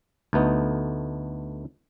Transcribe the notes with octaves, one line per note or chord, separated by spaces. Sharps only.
D2 A3 B3 D#4